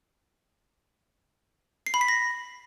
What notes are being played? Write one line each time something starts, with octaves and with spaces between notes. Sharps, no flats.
C7
B5
B6
A#6